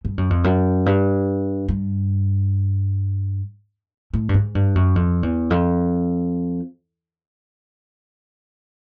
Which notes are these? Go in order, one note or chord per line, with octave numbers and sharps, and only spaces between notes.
G2
F#2
F2
F#2
G2
G2
A2
G2
G#2
G2
F#2
F2
E2
F2